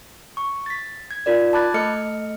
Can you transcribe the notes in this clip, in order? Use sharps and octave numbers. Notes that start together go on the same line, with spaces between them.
C#6
A6 B6
G#6
D#4 F4 A#4 D5
A5 B5 D6 F#6 G#6 A6
A3 A4 D#5 F6 C#7